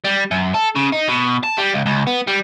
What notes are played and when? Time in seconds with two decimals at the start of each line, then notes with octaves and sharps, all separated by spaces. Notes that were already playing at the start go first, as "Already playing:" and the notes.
0.05 G3
0.31 F#2
0.54 A4
0.75 C#3
0.92 D#4
1.09 B2
1.44 A5
1.58 G3
1.74 C#2
1.86 C#2
2.07 B3
2.28 G3